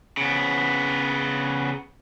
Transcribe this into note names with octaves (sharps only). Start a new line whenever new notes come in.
C#3 B3